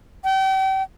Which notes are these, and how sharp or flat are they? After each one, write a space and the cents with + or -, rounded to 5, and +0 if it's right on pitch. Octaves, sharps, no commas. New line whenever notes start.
G5 -35